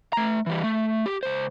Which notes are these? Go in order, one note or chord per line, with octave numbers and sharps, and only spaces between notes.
A3 A#5
E3 G3
A3
G4
C#2 C5